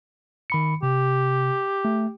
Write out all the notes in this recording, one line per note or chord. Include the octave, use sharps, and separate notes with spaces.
D#3 B5 C#7
C3 G4
A3